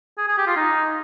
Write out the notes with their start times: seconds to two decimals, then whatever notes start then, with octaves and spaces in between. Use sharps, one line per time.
0.18 G#4
0.28 G#4
0.38 G4
0.47 F4
0.56 D#4